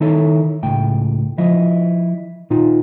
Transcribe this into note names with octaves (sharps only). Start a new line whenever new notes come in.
D#3 D#4 E4 A4 C#5
C#2 A2 G5
F3 E4 D#5
A#2 D#4 F4